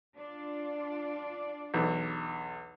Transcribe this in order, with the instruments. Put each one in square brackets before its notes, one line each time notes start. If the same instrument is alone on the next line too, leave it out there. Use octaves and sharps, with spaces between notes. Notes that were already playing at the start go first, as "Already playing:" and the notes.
[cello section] D4 F4 D5
[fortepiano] B1 E2